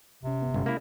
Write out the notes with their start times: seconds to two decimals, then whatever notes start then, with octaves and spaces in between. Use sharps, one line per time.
0.23 G1 C3 C#4
0.42 G1 B3
0.54 G1 G#3 C#4
0.66 A#3 E4